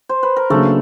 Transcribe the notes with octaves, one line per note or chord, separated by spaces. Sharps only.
C5
B4
A#4
C#3 F#3 A3 A#3 D4 A4